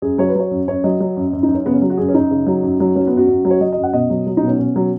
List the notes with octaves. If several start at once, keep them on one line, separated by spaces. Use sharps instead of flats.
F#2 G#4
F#3 C#5
B4
F#3 C#5
F#2
F#2 C#5
F#3 D#5
F#3
F#2
F#2
D#4
F#2
C#4
C#3 B3
C#4
F#3
F#4
F#2 G#4
C#4
F#2 D#4
C#3
F#3
F#2
F#3
F#3 C#4
B3
F#2 F#4
F#2
F#3
C#5
F#3 D#5
F#2 D#5
F#5
B2 D#5
F#3
F#3
D#4
B2
C#4
B2 C#4
F#3